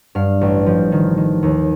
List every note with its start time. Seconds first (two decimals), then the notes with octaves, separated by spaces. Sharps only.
0.15 G2 F5
0.41 A1
0.66 F3
0.92 D#3
1.17 D#3
1.43 D#2